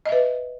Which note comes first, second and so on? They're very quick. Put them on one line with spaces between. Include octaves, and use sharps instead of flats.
D#5 E5 B4